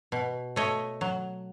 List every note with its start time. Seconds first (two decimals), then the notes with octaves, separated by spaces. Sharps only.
0.12 B2
0.56 A3 C#5 D#5
1.01 F#3